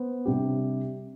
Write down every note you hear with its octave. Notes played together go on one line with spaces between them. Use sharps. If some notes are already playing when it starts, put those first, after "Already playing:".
Already playing: B3 C5
C3 G3 D4 G4